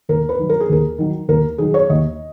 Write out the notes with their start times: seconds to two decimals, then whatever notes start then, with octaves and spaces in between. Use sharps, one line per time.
0.09 D#2 A#4
0.29 B4
0.38 D#3 F#3
0.49 A#4
0.60 G#4
0.69 D#2 A#4
0.98 D#3 F#3
1.28 D#2 A#4
1.58 D#3 F#3 G#4
1.74 C#5
1.90 D#2 D#5